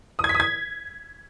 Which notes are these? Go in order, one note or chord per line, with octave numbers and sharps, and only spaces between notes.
D#6
G#6
B6
D#6
G#6